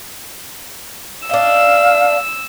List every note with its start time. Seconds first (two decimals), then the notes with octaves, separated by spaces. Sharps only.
1.30 D4 D#5 F5 E6